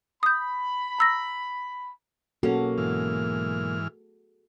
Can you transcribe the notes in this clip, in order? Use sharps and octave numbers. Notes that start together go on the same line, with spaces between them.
B5 D#6 G6
A#5 E6 A#6
B1 A#3 C#4 F#4 G#4 A4
G#2 E3 F6